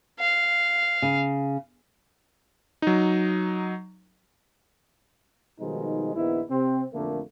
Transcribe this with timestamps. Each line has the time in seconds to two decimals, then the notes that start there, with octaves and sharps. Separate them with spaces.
0.20 F5
1.02 C#3
2.82 F#3 D#4
5.60 B2 D#3 F3 G3 G#3 D#4
6.15 A#1 D#2 B3 D#4 E4
6.49 C3 C4
6.92 A1 F2 D3 A3 A#3